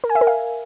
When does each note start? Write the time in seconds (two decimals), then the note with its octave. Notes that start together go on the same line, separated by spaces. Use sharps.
0.04 A#4
0.09 G#5
0.15 E5
0.21 A#4
0.27 F5